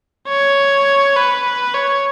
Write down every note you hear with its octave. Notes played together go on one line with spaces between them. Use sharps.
C#5
B4
C#5